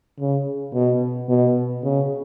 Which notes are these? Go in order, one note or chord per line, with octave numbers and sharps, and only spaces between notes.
C#3
B2
B2
C#3